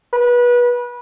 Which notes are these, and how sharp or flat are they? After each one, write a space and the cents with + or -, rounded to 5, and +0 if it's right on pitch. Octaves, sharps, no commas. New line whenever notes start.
B4 -25